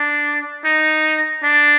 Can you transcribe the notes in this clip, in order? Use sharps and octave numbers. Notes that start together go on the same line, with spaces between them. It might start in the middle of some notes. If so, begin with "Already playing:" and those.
Already playing: D4
D#4
D4